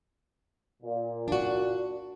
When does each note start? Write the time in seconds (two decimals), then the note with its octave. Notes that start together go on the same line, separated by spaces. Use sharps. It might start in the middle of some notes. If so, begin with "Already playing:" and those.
0.83 A#2
1.28 D4 F#4